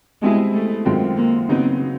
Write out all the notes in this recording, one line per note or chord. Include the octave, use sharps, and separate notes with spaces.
B2 G3 G#3 C4 E4 G#4
A3
F#2 D#3 G#3 C4 F4
A#3
C#3 F#3 B3 C4 D#4